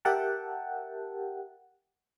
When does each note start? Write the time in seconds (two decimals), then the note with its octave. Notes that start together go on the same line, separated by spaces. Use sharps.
0.05 G4 A#4 E5 F#5 G5 A5